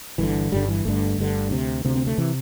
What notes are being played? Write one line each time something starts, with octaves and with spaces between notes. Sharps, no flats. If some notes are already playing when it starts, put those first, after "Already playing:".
G1 G2 D3 E3
G1 G2 D3 G3
E3
G1 G2 D3 A3
G1 G2 D3
D2 C3
D2 C3 C4
C4
A3
C3 E3